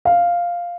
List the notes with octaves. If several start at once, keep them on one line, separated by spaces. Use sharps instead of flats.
F5